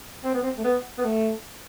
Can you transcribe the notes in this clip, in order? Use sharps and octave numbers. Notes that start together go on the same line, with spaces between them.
C4
B3
C4
A3
B3
B3
A3